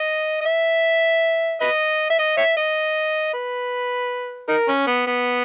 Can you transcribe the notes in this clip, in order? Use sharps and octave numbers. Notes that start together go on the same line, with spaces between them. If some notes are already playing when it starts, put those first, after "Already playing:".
Already playing: D#5
D#5
E5
B4 D#5
E5
D#5
C#5 E5
D#5
B4
D#4 A#4
C#4
B3
B3